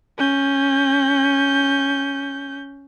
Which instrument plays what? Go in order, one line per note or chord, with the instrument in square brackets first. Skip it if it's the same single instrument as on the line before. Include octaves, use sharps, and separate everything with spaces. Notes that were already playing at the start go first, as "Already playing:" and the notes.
[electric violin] C#4 G6